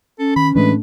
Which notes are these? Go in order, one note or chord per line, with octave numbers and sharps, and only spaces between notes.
C#4 A4
D#3 B5
A2 E3 G#3 A3 D4 B4